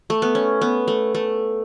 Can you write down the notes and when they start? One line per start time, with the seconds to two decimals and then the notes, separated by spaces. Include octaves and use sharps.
0.10 A3
0.22 B3
0.35 C#4
0.61 B3
0.88 A3
1.15 A3